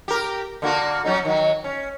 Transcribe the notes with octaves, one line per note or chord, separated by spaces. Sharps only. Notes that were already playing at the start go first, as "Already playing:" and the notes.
G4 A#4
D3 A#3 F#4
F#3 C#4 D#4
D#3 F#3
C#4